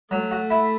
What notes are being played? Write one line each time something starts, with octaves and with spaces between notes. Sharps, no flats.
F#3 A3
F#4
E4